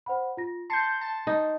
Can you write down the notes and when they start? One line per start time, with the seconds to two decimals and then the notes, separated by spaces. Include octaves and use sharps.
0.06 C5 F#5 B5
0.37 F4 A#6
0.70 A5 C6 G6 C7 C#7
1.01 A5
1.27 D#4